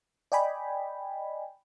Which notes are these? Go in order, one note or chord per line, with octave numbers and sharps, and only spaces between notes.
D5 D#5 G5 G#5 B5